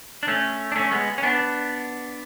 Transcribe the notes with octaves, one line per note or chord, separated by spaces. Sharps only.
D4
A3 C#4
D4
A3 C#4
G#3 B3
C#4
B3 D4